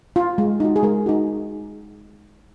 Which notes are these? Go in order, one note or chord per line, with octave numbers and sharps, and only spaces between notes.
F4
G#3
D#4 F#4
G#4
G#3 A#4
D#4 F#4